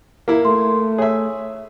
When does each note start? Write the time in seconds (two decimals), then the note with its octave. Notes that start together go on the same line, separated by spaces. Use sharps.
0.28 A#3 E4
0.45 A3 C6
0.98 G#4 C#5 E5